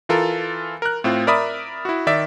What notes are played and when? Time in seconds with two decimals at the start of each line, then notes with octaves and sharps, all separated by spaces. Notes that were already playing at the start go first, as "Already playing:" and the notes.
0.09 E3 F4 A4 A#4
0.82 A#4 F#6
1.04 A2 C4 F4
1.27 A#4 D5 E5 B5 D#6
1.85 E4 F#4
2.07 D#3 D5 E5